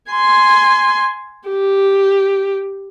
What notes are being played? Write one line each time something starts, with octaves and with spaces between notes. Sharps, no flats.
G#5 C6
G4